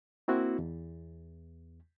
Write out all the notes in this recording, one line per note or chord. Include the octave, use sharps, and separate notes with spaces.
A#3 C4 E4 F#4
E2